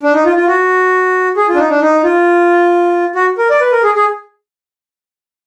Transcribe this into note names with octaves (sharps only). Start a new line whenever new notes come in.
D4
D#4
F4
F4
F#4
G#4
F4
D4
D#4
D4
D#4
F4
F#4
A#4
D5
B4
A#4
G#4
G#4